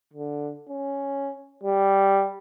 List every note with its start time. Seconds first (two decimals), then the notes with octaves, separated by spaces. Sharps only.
0.14 D3
0.69 C#4
1.64 G3